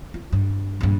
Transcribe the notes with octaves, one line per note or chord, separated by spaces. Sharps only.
F4
G2
A#1 G2